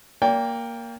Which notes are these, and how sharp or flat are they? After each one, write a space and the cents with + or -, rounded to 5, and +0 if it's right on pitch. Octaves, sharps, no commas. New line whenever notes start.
A#3 +0 D5 -35 G5 +20